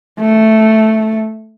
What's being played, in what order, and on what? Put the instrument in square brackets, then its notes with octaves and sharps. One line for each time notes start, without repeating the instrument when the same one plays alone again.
[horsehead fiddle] A3